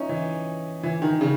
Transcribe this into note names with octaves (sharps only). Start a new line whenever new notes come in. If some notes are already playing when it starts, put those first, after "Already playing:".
Already playing: C#4 D#4 E4
E3
E3
D#3
C#3